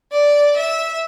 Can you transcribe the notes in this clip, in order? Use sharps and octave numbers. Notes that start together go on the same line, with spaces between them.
D5
E5